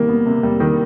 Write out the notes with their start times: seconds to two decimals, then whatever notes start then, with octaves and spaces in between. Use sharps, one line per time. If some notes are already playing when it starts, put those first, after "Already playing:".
Already playing: C3 D#3 G3 A#3
0.09 B3
0.26 C3
0.43 G3
0.60 D#3